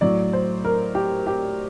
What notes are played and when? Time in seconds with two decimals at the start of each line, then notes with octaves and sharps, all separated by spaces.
0.01 A2 F#3 D5
0.33 C5
0.65 A#4
0.95 G4
1.27 G4